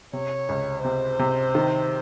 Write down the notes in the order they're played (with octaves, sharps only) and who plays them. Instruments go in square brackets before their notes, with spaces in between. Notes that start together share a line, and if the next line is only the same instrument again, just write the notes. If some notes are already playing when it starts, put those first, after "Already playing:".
[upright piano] C3 [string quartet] C#5
[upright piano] C#2
[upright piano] C3 [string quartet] C5
[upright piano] C3
D#3